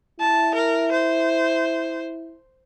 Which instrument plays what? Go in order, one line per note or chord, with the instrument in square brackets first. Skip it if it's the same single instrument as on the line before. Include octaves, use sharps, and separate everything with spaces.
[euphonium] E4 [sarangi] A5
[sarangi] A#4
C5